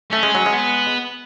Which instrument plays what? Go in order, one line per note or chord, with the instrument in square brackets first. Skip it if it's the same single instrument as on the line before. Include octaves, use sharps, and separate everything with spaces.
[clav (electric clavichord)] A3 [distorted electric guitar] C#4
[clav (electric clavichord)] G#3
F#3
G#3
[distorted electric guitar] B3